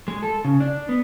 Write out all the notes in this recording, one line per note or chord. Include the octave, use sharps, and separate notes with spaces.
G#3
A4
C#3
D4
B3